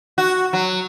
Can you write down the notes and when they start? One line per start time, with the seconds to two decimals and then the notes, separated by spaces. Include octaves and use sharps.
0.18 F#4
0.53 F#3